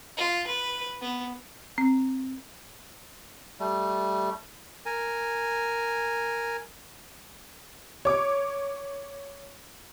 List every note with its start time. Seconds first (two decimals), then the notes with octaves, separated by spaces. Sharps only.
0.17 F4
0.47 B4
1.01 B3
1.78 C4
3.60 G3 A3
4.86 A#4 G#5
8.05 C#5 D6